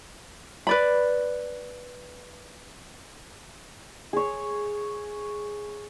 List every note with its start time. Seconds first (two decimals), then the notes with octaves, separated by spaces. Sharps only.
0.67 B4 D5 B5
4.13 G#4 C#5